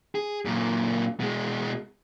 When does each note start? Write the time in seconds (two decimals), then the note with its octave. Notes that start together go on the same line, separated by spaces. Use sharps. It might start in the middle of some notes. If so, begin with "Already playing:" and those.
0.15 G#4
0.45 F#2 A#2
1.20 B2 G#3